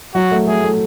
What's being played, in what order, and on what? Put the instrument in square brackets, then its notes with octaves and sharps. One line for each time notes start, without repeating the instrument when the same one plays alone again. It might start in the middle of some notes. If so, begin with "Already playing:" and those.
[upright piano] F#3 [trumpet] F#4
[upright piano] A3
[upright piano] A3 [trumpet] G#4
[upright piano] A3